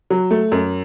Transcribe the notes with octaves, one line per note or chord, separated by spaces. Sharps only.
F#3
A3
F#2